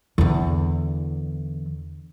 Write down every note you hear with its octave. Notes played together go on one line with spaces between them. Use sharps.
E2 D3